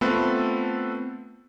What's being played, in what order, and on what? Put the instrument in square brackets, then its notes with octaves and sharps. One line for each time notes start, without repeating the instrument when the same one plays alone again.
[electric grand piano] A3 B3 C4 F4 A4 B4